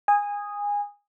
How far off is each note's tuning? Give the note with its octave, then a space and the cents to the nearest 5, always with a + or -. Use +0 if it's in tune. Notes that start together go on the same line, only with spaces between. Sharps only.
G#5 -20 D#6 +0